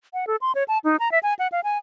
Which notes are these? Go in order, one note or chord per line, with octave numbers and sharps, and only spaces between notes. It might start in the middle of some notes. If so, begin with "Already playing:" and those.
F#5
A4
C6
C#5
A5
D#4
A#5
E5
G#5
F#5
F5
G#5